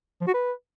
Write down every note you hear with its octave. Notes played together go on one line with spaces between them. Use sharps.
F3
F#4
B4